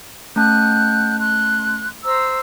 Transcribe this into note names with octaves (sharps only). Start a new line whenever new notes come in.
A3 C#4 F#5 A5 F#6 G6
C6 F#6
C5 A#5 E6